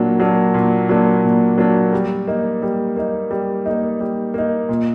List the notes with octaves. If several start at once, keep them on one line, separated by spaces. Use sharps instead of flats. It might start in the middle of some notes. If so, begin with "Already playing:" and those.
Already playing: A#2 F#3 A#3 D4
F#3 A#3 D4
A#2
F#3 A#3 D4
A#2
F#3 A#3 D4
G3
A#3 D#4
G3
A#3 D#4
G3
A#3 D#4
G3
A#3 D#4
A#2